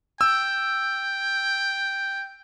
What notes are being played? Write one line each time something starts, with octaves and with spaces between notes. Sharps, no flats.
G5 E6